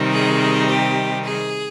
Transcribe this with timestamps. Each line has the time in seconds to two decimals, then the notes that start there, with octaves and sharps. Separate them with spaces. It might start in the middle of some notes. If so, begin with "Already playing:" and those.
Already playing: C3 D#3 G3 C4 D#4
0.12 G#4
0.68 G4
1.24 G#4